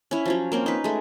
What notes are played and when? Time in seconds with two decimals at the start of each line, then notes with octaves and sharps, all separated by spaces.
0.11 C#4 E4
0.26 F3 F#3 C#4
0.52 A#3 C4 C#4
0.66 D#4 B4
0.84 G#3 A3